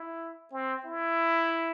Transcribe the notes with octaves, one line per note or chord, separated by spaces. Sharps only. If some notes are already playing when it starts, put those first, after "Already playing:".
Already playing: E4
C4
E4